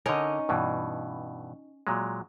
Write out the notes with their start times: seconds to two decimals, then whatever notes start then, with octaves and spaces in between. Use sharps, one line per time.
0.06 D3 C#4 D#4 A#4
0.49 G2 B2 E3
1.87 A#2 F#3 G#3